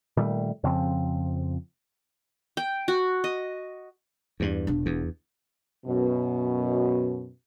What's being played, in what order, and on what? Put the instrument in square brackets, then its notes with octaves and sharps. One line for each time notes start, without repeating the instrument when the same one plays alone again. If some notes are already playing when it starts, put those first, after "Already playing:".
[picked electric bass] A#2 D#3 G3 A3
F2 C#3 F3 C4
[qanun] G5
F#4
D#5
[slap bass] E2 G2
[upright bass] E1 D4
[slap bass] E2
[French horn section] F#2 B2